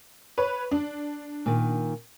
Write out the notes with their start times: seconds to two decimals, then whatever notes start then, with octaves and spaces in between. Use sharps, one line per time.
0.38 B4 C#5
0.71 D4
1.46 A#2 D#3